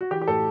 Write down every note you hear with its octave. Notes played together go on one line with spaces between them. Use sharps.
F#4
E3 G4
G4
A2 A4